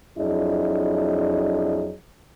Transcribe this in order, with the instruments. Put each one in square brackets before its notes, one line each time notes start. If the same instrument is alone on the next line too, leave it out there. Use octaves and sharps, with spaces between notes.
[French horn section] F2 F#3 D4 E4 G#4 D#5